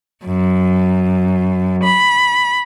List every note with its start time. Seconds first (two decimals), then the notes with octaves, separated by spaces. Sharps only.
0.25 F#2
1.83 B5